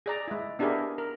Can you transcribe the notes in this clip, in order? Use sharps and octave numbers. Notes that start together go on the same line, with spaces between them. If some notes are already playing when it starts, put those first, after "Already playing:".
G#4 D5 A#5
G#3 E4
B3 D4 E4 G4 G#4 A#4
A#4